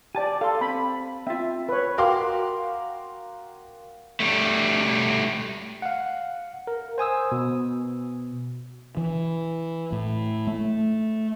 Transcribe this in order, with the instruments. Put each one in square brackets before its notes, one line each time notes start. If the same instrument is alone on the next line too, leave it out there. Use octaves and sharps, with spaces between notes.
[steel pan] G4 D5 [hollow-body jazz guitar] G#5 A5
[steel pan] A4 [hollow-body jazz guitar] F5 C6
[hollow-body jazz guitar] C4 [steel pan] B5
[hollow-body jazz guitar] C4 F4 [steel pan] E5
[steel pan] B4 C#5
[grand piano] F#4 A#4 F5 G5 C6 D6
[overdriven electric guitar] G3 A3
[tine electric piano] F5 F#5
A#4
C5 G#5 D#6 E6
B2
[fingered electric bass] E3
A2
A3